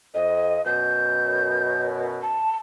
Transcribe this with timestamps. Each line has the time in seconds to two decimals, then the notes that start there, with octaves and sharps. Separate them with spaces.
0.15 F2 D#5
0.66 F#2 B2 G6
2.22 A5